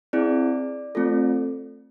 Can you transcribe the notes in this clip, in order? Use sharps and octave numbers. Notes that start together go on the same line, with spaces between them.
C4 E4 G#4 D5
A3 C4 F4 A4